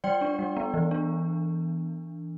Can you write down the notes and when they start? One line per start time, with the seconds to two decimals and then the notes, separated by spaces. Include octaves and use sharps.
0.04 G3 D5 G5
0.21 D4
0.39 G3
0.57 B3
0.74 E3
0.91 D4